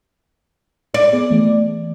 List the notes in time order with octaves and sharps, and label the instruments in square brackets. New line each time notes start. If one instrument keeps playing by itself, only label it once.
[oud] D5
[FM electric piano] B3 G#4
E3 A3